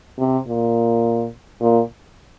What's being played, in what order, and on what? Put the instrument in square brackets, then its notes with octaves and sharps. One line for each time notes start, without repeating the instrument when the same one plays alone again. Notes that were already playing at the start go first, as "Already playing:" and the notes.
[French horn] C3
A#2
A#2